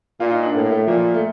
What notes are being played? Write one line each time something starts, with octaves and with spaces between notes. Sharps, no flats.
A#2 F4
D#4
D4
A2 A#3
A3
A#2 F3
A3